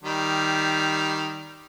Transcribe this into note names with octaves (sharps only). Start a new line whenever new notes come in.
D#3 G3